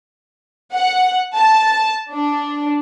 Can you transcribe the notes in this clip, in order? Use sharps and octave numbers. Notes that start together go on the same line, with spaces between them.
F#5
A5
D4